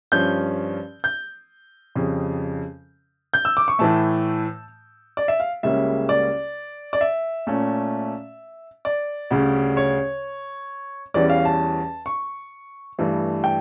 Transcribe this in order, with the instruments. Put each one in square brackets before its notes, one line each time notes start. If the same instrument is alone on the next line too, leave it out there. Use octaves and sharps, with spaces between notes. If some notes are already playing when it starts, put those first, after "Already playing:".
[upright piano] G2 F3 C#4 G6
G6
F2 C#3 G3
G6
E6
D6
C#6
A2 E3 A3 A5
D5
E5
F5
C#2 C#3 G3 A#3 C#4 E5
D5
D5
E5
A#2 A3 C#4
D5
D2 C#3 G3 C#4
C#5
E2 E3 G3 C#4 D5
F5
A5
C#6
G2 E3 A3
G5